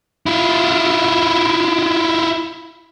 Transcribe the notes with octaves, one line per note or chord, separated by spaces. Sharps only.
E4 F4